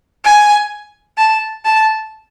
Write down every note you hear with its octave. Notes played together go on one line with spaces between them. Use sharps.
G#5
A5
A5